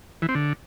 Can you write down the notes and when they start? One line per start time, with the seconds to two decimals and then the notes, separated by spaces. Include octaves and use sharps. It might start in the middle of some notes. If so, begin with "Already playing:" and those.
0.22 E3
0.29 C4
0.35 D3